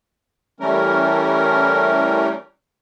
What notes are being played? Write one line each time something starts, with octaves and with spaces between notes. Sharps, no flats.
E3 G3 A3 C#4 A#4